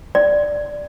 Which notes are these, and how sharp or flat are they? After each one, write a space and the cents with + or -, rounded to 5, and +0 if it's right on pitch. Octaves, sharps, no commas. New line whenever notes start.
D5 +0